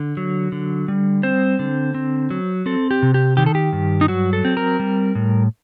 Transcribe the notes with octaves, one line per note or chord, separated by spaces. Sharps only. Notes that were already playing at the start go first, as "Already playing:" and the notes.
Already playing: D3
F#3
D3
G3
C4 C5
D3
C4
F#3
C4 A4
G4
C3
G4
D#3 G4
A4
G4
G2
D#4
F#3 F#4
A4
C4
A#4
G3
A2